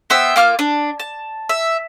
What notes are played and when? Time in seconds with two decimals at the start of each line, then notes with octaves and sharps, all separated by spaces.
0.10 B3 C5 E5 G5
0.36 A#3 F4 D6 F6
0.59 D4
1.00 A5
1.49 E5